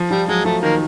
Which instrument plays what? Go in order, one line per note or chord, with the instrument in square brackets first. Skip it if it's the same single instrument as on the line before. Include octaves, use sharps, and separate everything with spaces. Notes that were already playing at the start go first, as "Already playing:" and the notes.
Already playing: [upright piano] F3
[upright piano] F3 [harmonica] G3
[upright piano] F#3 [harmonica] G#3
[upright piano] F3 [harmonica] A3
[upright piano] D#3 [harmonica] A#3